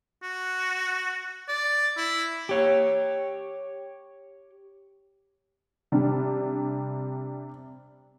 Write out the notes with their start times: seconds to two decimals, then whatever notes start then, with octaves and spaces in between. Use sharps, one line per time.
0.23 F#4
1.48 D5
1.97 E4
2.49 G4 C#5
5.92 C3 G3 D4